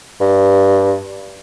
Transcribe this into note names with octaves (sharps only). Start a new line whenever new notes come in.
G2